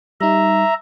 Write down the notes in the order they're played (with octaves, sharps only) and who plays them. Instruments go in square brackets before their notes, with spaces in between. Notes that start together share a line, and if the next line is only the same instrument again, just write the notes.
[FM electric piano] G3 D#4 [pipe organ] E5 A#5